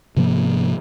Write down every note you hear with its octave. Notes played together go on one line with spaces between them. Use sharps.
G#2 C3 F3 A#3